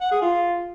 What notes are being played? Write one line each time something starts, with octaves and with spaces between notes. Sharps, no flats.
F#5
G#4
F4